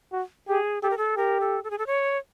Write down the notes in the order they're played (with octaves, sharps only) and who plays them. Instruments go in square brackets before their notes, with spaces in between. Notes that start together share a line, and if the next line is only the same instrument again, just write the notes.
[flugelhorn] F#4
[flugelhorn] G4 [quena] G#4
[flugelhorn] G4 [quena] A4
[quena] A#4
A4
[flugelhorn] G4 [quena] A#4
[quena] A4
A4
G#4
A4
C#5